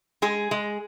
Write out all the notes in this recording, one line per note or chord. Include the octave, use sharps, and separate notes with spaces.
G#3 G#4
G#3